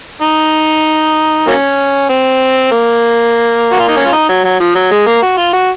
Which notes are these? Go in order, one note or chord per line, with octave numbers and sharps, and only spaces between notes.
D#4
F#3 A#3 C#4
C4
A#3
F#4
F4
D#4
C#4
F4
D#4
F#3
F#3
F3
F#3
G#3
A#3
F#4
F4
F#4